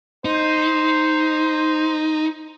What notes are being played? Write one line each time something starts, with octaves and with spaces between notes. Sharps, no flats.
D#4 C5